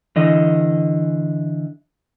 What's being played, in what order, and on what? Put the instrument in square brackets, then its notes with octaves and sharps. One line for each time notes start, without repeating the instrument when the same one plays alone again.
[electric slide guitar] D3 E3 D#5